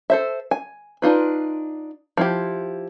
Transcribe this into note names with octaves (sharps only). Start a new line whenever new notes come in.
A4 C5 E5
G#5
D4 D#4 F4 B4
F3 E4 G4